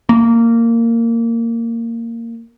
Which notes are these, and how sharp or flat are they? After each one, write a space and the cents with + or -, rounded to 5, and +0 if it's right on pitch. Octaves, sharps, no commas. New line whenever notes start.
A#3 -15